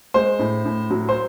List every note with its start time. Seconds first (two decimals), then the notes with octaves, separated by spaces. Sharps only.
0.14 G#3 C5
0.39 A2
0.65 A2
0.90 F#3
1.09 C5